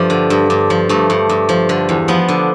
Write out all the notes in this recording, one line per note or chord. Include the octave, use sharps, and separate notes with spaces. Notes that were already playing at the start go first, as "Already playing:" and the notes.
Already playing: G2 F3 G3 A3
D3
G2
G2
F3
G2 A3
G2
G2
F3
D3
E2
F3 B3
D3